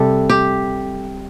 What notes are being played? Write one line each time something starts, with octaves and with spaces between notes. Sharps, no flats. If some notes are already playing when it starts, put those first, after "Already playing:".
Already playing: C3 G3 G4 A4
G4